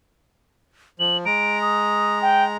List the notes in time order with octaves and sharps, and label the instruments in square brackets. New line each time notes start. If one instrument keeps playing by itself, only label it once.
[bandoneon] F3 [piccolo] F#7
[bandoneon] G#3 A#5 [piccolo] D7
[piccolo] D#6
G5